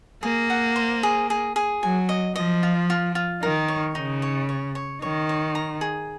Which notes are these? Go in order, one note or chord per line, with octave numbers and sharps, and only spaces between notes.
A#3 G#4
F#5
C5
G#4
G#4
G#4
F#3 G#5
D#5
F3 D#5
F4
F4
F4
D#3 A#4
C#5
C#3 D#4
C#5
C#5
C#5
D#3 C#5
C#5
A#5
G#4